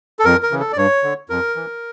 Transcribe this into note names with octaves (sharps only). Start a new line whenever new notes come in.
A4
F2 A#4
A#4
C#3 E3
A4
D5
G2 C#5
D3
F2 A#4
E3